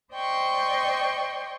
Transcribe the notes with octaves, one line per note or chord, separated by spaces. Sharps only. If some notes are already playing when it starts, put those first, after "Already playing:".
C5 D5 D#5 G5 C6 C#6